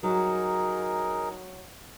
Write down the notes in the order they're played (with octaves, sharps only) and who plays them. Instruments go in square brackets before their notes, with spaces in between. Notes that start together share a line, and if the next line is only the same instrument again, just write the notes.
[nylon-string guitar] F#3 [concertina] D#4 G#4 A#4